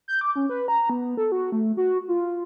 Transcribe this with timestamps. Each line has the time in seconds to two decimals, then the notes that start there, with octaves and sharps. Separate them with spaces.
0.08 G6
0.21 D6
0.36 C#4
0.50 B4
0.68 A#5
0.90 B3
1.17 A4
1.32 F#4
1.52 A3
1.77 F#4
2.08 F4